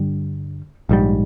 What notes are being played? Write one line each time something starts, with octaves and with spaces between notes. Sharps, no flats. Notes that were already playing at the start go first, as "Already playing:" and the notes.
Already playing: G2 D3 G3
A#1 G#2 G3